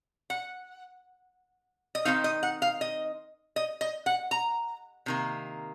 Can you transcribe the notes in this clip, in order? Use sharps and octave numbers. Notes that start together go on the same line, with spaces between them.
F#5
D#5
D#3 G#3 C4 D#4 F5
D#5
F#5
F5
D#5
D#5
D#5
F#5
A#5
C3 D#3 A#3